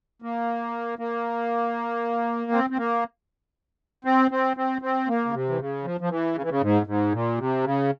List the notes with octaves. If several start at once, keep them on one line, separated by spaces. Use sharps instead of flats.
A#3
A#3
C4
C4
A#3
C4
C4
C4
C4
A#3
C#3
C3
E3
C#3
F3
F3
E3
C#3
E3
C#3
G#2
G#2
A#2
C3
C#3